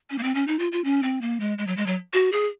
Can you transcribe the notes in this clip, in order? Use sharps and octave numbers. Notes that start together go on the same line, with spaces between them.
C#4
A#3
C4
C#4
D#4
F4
F4
C#4
C4
A#3
G#3
G#3
F#3
G#3
F#3
F#4
G#4